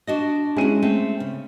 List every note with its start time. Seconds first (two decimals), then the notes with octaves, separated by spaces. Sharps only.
0.07 D4 F#4 D#5
0.57 G#3 C#4 E4 F#4 D#7
0.82 A3 C4
1.20 C#3